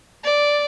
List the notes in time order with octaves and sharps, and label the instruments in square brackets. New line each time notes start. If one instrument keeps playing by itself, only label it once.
[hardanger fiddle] D5